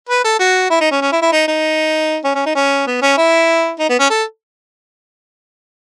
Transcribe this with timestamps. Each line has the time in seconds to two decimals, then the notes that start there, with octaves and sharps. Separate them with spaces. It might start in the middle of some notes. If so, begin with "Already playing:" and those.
0.09 B4
0.24 A4
0.39 F#4
0.70 E4
0.81 D#4
0.91 C#4
1.01 C#4
1.12 E4
1.22 E4
1.32 D#4
1.48 D#4
2.24 C#4
2.35 C#4
2.46 D#4
2.55 C#4
2.87 B3
3.02 C#4
3.17 E4
3.79 D#4
3.89 B3
3.99 C#4
4.10 A4